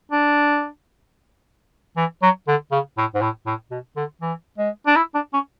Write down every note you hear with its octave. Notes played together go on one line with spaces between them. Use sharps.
D4
E3
F#3
D3
C#3
A2
G#2
A2
A2
B2
D3
E3
G#3
D4
E4
D4
C#4